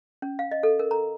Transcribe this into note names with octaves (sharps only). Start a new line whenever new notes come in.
C#4
F5
D#5
A4
A#4
A#5